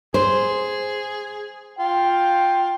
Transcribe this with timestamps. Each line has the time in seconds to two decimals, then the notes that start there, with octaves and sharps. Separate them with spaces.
0.14 G#4 C5
1.79 F4 G5